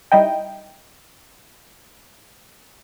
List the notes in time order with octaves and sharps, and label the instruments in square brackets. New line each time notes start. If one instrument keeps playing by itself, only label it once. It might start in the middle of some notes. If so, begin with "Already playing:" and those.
[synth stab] G3 D#4 E4 D#5 G5